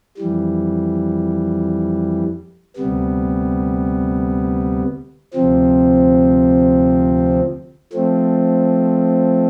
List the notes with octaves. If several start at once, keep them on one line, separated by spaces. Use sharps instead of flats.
F2 E3 G3
D2 C3 G3 B3
D2 C3 F3 C4
F3 A3 C4